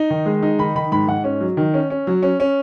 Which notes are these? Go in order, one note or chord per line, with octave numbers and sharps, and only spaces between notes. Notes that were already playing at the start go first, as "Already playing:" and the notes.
Already playing: D#4
D#3
G#3
D#4
D#3 B5
D#3 B5
G#2 B5
G#2 F#5
C#4
F#3
D#3
C#4
C#4
F#3
C#4
C#4